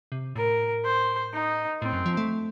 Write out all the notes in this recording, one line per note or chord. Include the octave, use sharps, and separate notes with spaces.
C3
A2 A#4
C5
D#4
A2 C4
F#2
F3
A3